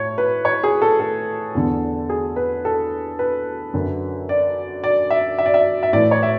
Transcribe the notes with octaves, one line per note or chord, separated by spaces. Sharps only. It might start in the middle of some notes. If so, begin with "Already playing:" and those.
Already playing: A2 C#5
B4
C#5
G#4
A4
A4
E2 D3
G#4
B4
A4
B4
F#2 D3
D5
D5
E5
E5
D5
E5
E5
A2 E3 D5
C#5
E5